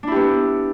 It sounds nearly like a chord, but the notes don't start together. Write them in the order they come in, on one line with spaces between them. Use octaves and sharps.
D4 E4 G4 B3